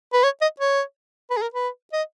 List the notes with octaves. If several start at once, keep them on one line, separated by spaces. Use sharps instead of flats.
B4
C#5
D#5
C#5
B4
G#4
A#4
B4
D#5